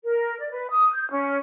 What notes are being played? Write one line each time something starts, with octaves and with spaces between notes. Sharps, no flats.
A#4
D5
B4
D#6
G6
C#4